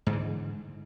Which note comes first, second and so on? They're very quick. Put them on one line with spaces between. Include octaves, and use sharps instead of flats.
G#2 D3 E3